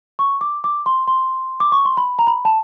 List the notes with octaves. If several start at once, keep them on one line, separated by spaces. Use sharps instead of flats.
C#6
D6
D6
C6
C6
D6
C#6
C6
B5
A#5
B5
A5